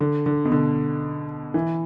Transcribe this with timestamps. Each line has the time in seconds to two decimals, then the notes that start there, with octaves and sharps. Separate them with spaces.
0.01 D3
0.26 D3
0.45 B2
0.52 D3
1.54 E3